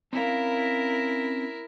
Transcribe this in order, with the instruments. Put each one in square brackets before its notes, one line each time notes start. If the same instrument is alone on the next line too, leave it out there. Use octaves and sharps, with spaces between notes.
[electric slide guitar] C4 C#4 F5 [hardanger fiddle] E4 A#4